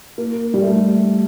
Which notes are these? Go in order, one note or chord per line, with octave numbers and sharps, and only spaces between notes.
A#3
G3
A3